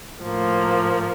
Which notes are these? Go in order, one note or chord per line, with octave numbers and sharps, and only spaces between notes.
A2 F3 A#3